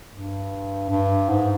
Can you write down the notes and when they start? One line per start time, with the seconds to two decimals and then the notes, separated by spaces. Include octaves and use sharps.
0.12 G2
0.90 G2
1.29 G#2